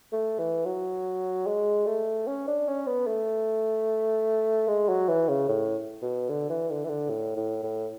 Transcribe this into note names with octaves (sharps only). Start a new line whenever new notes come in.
A3
E3
F#3
G#3
A3
C#4
D4
C#4
B3
A3
G#3
F#3
E3
C#3
A2
B2
D3
E3
D3
E3
D3
A2
A2
A2